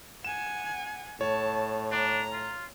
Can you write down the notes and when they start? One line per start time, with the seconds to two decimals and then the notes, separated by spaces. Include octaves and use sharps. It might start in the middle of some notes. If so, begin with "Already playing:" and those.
0.25 F#5 G#5 E7
1.21 A2 C#5 A5
1.92 D4 A#5
2.32 F4